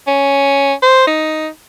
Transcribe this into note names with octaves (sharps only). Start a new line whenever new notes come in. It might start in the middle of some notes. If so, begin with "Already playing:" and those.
C#4
C5
D#4